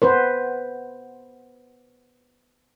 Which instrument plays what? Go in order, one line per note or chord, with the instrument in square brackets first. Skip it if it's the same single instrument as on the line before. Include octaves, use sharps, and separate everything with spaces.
[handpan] B3 B4 C5